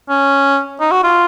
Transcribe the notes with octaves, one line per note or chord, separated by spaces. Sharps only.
C#4
D#4
F#4
F4